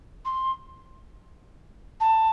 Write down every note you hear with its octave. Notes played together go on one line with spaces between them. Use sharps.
C6
A5